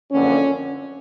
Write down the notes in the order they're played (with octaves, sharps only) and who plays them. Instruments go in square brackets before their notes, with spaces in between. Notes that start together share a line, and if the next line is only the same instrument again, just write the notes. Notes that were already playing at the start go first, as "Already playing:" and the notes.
[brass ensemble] F#1 F2 D3 C#4